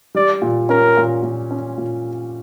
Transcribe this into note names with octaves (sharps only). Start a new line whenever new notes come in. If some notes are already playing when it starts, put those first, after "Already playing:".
G3 D5
A#2
C#4 A#4
A#2
A#2
C#4
A#2